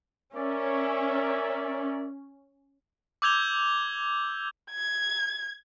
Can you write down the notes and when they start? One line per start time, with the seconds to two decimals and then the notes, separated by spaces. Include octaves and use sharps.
0.35 C#4 A#4 D5 E5
3.22 D6 E6 G6 G#6 F7 G7
4.71 G#6